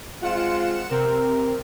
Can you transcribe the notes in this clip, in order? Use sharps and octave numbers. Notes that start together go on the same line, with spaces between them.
G#3 C4 F4 F#5 C#7 E7
C3 C4 A#4